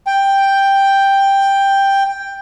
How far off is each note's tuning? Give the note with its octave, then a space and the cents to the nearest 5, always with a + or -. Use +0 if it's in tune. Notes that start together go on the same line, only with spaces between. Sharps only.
G5 +5